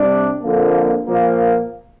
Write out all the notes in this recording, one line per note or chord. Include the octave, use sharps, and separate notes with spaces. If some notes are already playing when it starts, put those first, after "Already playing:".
Already playing: C3 G3 D4
F2 D3 F3 A#3
A#2 F3 A#3